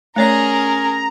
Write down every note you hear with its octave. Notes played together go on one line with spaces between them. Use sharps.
A3 C#4 G#4 A#4 C#5 D5 A#5